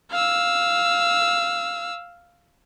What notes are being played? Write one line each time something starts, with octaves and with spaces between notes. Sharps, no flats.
F5 E6